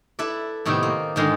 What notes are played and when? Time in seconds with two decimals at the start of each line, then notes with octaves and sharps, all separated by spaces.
0.19 E4 A4 B4 D5
0.66 A2 C3 D#3 B3 D5 E5
0.83 A#3
1.16 G#2 D3 D#3 G#3 F4 C6